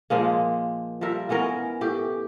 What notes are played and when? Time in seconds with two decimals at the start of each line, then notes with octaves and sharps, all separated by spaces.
0.10 A#2 F3 G#3 A#3
1.01 F3 G3 A#4 E5
1.29 E3 B3 C#4 A#4
1.81 A2 G4